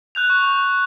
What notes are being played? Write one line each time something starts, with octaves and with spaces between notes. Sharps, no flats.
F#6 G6 F7
C#6